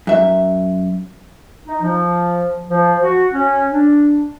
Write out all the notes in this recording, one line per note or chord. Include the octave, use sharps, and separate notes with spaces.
F#2 E5
D#4
F3
F3
F#4
C#4
D4